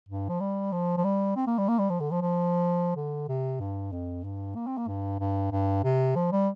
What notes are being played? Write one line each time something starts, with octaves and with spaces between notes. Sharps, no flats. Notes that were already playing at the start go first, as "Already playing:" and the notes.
G2
F3
G3
F3
F3
G3
C4
A#3
G3
A#3
G3
F3
D3
F3
F3
D3
C3
G2
F2
G2
A#3
C4
A#3
G2
G2
G2
C3
F3
G3